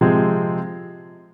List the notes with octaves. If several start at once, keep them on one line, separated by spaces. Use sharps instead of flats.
C3 F3 G#3 C4